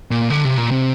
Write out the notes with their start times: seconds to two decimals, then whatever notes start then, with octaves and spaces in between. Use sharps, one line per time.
0.11 A#2
0.30 D3
0.45 C3
0.58 A#2
0.71 C3